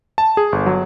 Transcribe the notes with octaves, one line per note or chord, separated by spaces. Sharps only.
A5
G#4
G1
F#3